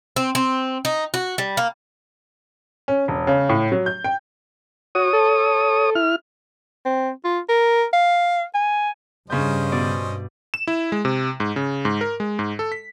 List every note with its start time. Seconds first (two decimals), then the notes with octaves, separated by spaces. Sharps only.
0.16 C4
0.35 C4
0.85 D#4
1.14 F#4
1.38 G3
1.57 A#3
2.88 C#4
3.08 E1
3.27 C#3
3.49 A2
3.72 F#3
3.86 G6
4.04 G5
4.95 F#4 C#5 D#6
5.13 A4
5.95 E4 F6
6.85 C4
7.24 F4
7.49 A#4
7.93 F5
8.55 G#5
9.30 G2 C#3 C#4 C5 D#5 G6
9.72 B2 D5
10.54 E7
10.67 E4
10.92 G#3
11.05 C3
11.40 G#2
11.56 C#3
11.85 G#2
12.01 A#4
12.20 G#3
12.39 G#2
12.59 A4
12.72 B6